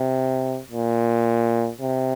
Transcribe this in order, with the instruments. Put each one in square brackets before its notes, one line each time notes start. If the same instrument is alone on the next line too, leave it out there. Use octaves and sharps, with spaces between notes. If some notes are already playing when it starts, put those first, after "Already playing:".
Already playing: [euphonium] C3
A#2
C3